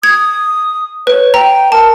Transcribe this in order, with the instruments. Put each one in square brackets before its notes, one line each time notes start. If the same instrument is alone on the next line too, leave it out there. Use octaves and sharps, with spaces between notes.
[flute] D#6 [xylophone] G#6
[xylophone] B4 [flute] C#5
[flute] G5 [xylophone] A#5
[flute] A#4 [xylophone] A5